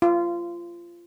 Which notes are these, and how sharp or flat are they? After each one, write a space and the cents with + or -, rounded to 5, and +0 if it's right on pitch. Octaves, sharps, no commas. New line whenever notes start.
F4 -20